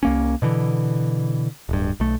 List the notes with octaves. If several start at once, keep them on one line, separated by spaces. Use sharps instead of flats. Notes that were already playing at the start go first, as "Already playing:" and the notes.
C2 A#3 C#4
B2 D3 E3
D1 G2
B1 A3